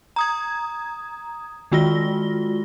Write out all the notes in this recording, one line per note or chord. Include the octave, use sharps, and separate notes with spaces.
A#5 D#6 G#6
D#3 G#3 F4 F#4 A#6 G7